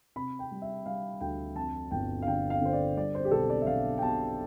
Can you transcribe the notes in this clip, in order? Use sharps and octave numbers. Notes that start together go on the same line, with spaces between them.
C3 B5
G5
G3
E5
G3 F5
D2 G5
F2 A5
G1 G5
F5
D3 G5
F5
D3 C5
D5
G3 D5
C5
G4
B1 A4
D5
E5
B1 F5
G5
B2 A5